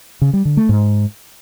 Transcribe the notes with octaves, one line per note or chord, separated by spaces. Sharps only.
C#3
G3
D3
A3
G#2